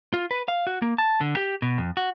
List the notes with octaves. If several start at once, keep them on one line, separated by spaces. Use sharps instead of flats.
F4
B4
F5
F#4
A#3
A5
D3
G4
B2
F2
F#4